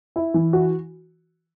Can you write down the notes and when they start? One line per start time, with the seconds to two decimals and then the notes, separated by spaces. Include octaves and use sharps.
0.16 E4
0.34 E3
0.53 F#4